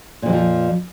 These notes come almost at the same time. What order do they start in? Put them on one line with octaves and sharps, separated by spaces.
A#2 F2 F#3 F3